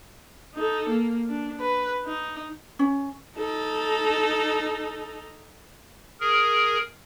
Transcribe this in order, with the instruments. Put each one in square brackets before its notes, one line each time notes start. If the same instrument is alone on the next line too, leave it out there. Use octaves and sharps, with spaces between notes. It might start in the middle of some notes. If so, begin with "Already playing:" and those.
[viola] D#4 A4
A#3
D4
B4
D#4
[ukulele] C#4
[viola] D#4 A4
[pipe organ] G#4 A#4